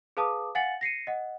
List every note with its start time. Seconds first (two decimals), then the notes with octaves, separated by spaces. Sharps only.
0.17 G#4 B4 F5 A5 D6 D#6
0.55 F5 F#5 G#5 A6 C#7 F#7
0.81 A#6 C7 C#7 D#7
1.07 D#5 F#5